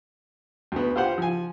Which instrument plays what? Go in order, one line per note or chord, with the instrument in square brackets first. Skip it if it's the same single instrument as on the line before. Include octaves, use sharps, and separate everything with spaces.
[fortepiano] D2 B3
F4 G4 C5 F#5
F3 G#5